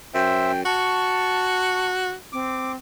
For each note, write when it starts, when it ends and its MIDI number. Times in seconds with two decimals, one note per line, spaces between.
0.14 0.62 42
0.14 0.52 72
0.14 0.52 76
0.14 0.64 79
0.65 2.14 66
0.65 1.89 81
0.65 1.87 85
2.33 2.76 60
2.33 2.72 86